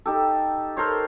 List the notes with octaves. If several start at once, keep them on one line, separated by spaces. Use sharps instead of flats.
D#4 G4 A4
A4 A#4 C5 C#5